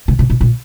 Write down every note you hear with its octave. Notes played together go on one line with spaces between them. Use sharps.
C#3
C3
A#2
A#2